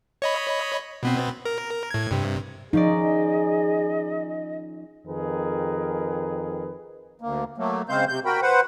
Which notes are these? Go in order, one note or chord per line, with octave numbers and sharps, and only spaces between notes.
C#5 D#5 B5
B2 B3 C4
A#4
A2 G#6
G2 C3
F3 C#4 D#4 G#4 D5 D#5
F2 D#3 G#4 A#4 B4
D2 A#3
F#3 A3 A#3
C#3 G#3 C4 C5 F5 G6
C3 G6
F#4 A#4 G5 B5
B4 C5 F#5